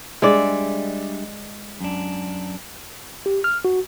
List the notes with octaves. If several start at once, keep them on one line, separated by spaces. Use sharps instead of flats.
G3 G#3 D4 D5 E5
F#2 D4
G4
F6
F#4